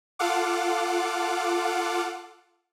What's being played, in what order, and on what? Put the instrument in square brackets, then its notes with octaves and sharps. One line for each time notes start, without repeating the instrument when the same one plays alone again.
[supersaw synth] F4 A4 F5 F#5 D6